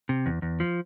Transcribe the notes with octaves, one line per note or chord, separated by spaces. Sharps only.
C3
E2
E2
F3